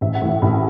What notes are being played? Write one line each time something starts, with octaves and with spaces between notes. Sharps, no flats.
A1 E5
F#5
A2 E3
A1 B5